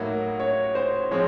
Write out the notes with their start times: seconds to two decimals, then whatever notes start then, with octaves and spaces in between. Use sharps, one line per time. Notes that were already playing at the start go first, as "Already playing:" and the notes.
Already playing: A2 F#3 A#3 D#4 F#4
0.40 C#5
0.75 C5
1.11 F3 G#3 C4 C#5